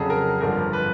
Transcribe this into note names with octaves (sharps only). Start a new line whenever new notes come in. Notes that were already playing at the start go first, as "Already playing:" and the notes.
Already playing: F2 C#3 F#3 G#4 A4
A#4
G#1 G2 D3 F3 A#4
B4